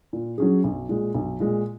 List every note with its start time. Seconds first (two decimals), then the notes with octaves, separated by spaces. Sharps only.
0.13 A#2
0.38 F#3 C#4 G#4
0.64 B1
0.89 A#2 G#3
1.14 B1
1.40 A#2 G#3